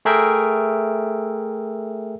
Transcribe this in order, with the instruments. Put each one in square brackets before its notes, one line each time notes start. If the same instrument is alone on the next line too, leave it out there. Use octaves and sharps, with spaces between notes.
[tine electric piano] A3 G#4 A#4 E5 G5